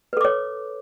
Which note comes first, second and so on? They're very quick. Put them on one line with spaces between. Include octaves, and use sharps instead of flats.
B4 A4 D6 C#5